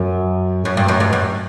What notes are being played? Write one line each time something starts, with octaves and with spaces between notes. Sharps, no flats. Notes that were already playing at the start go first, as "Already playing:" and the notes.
Already playing: F#2
F#2
G2
F#2
G2
F#2